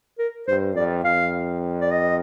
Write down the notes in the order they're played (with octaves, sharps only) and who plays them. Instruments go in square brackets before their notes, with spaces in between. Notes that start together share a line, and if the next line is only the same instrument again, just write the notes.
[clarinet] A#4
[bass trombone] G2 [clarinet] C5
[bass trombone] F2 [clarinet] D5
[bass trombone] F2 [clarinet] F5
[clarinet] D5
D#5